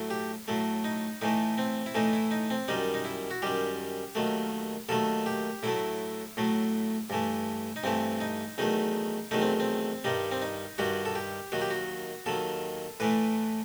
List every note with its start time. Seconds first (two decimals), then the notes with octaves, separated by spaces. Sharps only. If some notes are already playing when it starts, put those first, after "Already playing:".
Already playing: A2 F#3 A3
0.10 G4
0.48 A2 F#3 A3
0.84 D#4
1.21 A2 E3 A3 D#4
1.58 C4
1.86 E4
1.94 A2 E3 A3 D#4
2.13 E4
2.31 D#4
2.50 C4
2.68 F#2 D#3 G3 D#4
2.94 D#4
3.05 E4
3.31 F#4
3.42 F#2 D#3 G3 G4
4.15 D#2 D#3 F#3 A3
4.89 D#2 D#3 F#3 A3 A4
5.26 G4
5.63 A2 F#3 A3 E4
6.37 A2 F#3 A3
7.10 G2 E3 A3
7.76 D#4
7.83 G2 E3 A3 C4
8.21 D#4
8.58 E2 D#3 F#3 A3 D#4
9.31 E2 D#3 F#3 A3 D#4
9.41 C4
9.60 C4
10.04 G2 D#3 G3 D#4
10.31 C4
10.42 D#4
10.78 G2 D#3 G3 F#4
11.05 A4
11.15 G4
11.52 D#2 D#3 F#3 F#4
11.61 G4
11.70 F#4
12.26 D#2 D#3 F#3 A4
13.00 A2 E3 A3 B4